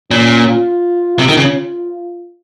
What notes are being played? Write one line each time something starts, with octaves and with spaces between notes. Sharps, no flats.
A#2 C#4
F4
C3 F4
D#3
C#3